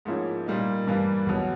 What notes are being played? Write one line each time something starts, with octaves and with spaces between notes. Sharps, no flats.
G#2 F3 A#3 C#4 E4
A#2 G3 A#3 D#4
G2 E3 G3 A#3
E2 B2 F#3